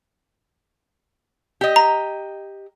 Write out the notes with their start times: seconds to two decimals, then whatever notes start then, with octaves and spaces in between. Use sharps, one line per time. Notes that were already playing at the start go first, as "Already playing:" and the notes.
1.61 G4 D#5
1.76 A#5